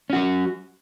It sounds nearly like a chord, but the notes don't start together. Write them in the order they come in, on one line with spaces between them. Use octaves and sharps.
C#4 F#4 F#3